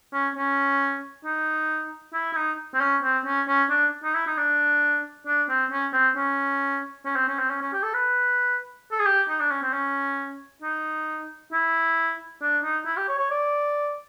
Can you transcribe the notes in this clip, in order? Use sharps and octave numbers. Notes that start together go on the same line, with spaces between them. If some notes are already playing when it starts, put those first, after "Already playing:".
C#4
C#4
D#4
E4
E4
D#4
C4
C#4
C4
C#4
C#4
D4
D#4
E4
D#4
D4
D4
C4
C#4
C4
C#4
C#4
C4
C#4
C4
C#4
C#4
G4
A4
B4
A4
G#4
G4
D#4
D4
C#4
C4
C#4
D#4
E4
D4
D#4
E4
G4
C#5
C#5
D5